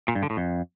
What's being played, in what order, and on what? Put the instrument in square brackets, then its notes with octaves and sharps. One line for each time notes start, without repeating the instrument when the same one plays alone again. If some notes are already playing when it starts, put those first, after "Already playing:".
[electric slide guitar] A#2
G2
D3
A2
F2